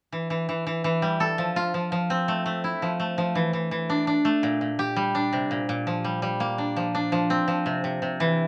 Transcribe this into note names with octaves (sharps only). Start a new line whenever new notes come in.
E3
E3
E3
E3
E3
G3
A4
F3
F4
F3
F3
C4
A3
A3
E4
F3
A3
F3
E3
E3
E3
D4
D4
A3
A#2
A#2
G4
G3
D4
C3
A#2
A#2
F3
G3
G3
A#3
D4
F3
D4
F3
C4
F3
C3
C3
C3
E3